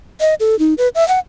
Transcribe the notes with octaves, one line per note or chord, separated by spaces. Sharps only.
D#5
A4
D#4
B4
E5
F#5